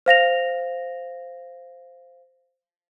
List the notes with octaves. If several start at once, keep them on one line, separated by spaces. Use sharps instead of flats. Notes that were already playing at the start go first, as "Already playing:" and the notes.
C5 F5 A#6 F7